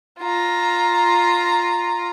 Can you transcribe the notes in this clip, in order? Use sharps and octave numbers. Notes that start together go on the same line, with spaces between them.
F4 A#5